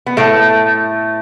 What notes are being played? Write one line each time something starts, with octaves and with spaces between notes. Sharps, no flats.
B3
A2 A3